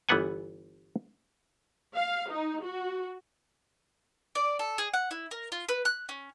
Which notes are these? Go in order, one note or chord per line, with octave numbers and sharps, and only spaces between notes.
G1 E3 G3 B3 F#5 G#5
F5
D#4
F#4
D5
A4
G#4
F#5
E4
A#4
F4
B4
F#6
C#4